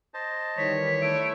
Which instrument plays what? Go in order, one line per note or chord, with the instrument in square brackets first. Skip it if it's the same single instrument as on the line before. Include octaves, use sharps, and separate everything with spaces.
[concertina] C5 D#5 A5
[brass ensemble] D#3 E3 G3 [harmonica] C#5 [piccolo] B6
[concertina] A3 E4 E5 [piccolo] D7